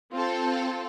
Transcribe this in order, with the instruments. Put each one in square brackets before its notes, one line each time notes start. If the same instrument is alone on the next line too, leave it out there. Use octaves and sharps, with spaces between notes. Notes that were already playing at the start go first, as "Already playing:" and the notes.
[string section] C4 F4 A4